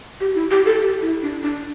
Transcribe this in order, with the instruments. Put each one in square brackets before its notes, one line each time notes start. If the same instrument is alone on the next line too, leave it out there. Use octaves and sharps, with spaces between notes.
[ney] G4
E4
G4
A4
G4
E4
D4
D4